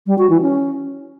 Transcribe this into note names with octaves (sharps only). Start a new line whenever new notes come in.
G3
F#4
E3
C#4